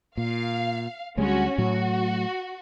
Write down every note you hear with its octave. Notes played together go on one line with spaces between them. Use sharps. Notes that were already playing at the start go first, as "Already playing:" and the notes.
A#2 F5
D2 G3 G#3 C#4 F#4
A2 F#3 F#4